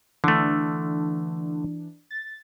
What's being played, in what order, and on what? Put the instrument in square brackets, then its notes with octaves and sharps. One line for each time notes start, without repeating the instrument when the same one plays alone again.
[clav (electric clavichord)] D3 A3 [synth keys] E3 D4
[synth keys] A6